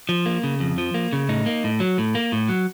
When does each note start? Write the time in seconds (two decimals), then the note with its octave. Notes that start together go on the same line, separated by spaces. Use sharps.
0.09 F3
0.26 A#3
0.44 C#3
0.60 F2
0.78 F3
0.94 A#3
1.13 C#3
1.29 A2 D#4
1.46 A#3
1.64 A2
1.80 F#3
1.98 A2
2.15 A#3
2.32 A2
2.49 F#3